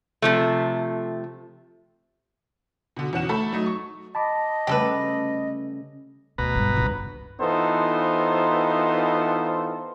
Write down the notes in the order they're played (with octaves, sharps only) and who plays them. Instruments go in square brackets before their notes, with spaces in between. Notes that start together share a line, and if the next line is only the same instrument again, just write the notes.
[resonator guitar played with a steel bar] C3 F3 A3
[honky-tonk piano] B2 D3
E2 B2 C#4 F#5 E7
A3 A4 B5
F#3 A3 D#4
C#6
[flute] D#5 [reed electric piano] A5 B5 D6
[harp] C#3 G3 A3 [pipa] G4 A4 B4
[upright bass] D2 [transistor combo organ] B2 B4 A#5
[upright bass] G1 G3
G1 C#2
[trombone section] E3 B3 D#4 F4 A4 C5